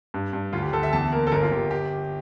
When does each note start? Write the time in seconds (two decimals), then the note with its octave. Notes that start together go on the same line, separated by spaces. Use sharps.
0.14 G2
0.33 G2
0.53 D2 F4
0.62 G4
0.72 D2 A4
0.83 E5
0.93 E2 A5
1.12 A#3 A#4
1.27 A4
1.31 G1 A#4
1.42 F4
1.52 G1 G4
1.71 G4